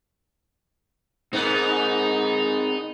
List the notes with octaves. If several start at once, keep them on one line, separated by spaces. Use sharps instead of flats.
G#2 B3 C4 D#4 A#4